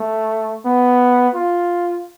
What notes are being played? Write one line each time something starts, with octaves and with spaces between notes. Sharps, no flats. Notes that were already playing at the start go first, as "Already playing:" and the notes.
Already playing: A3
B3
F4